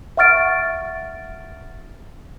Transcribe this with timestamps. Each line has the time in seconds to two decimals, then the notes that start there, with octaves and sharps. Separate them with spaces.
0.17 E5 F#5 C#6 F6 A6 D7